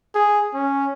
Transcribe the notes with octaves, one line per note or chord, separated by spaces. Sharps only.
G#4
C#4